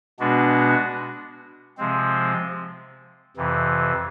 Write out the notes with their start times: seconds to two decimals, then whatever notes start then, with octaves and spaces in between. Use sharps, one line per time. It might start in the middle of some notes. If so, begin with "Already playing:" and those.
0.19 B2 G#3 B3 D4 F#4
1.78 C3 F3 G#3 C4
3.37 F2 C3 E3